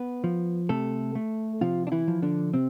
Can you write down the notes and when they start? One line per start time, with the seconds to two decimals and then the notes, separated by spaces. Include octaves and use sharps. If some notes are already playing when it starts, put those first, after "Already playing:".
Already playing: B3 B4
0.24 F3
0.69 C3 A3 A4
1.15 A3
1.61 C3 F3 F4
1.87 D4
1.92 E3 E4
2.08 F3
2.22 D3 D4
2.54 C3 C4